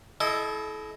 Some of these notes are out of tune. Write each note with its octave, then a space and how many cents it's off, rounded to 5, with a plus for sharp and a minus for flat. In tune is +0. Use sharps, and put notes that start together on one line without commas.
E4 +0 A4 -40 D#5 +0